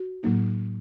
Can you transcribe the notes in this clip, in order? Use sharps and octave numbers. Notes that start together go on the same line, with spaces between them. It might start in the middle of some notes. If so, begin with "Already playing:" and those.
Already playing: F#4
A2 F#3 A#3 D#4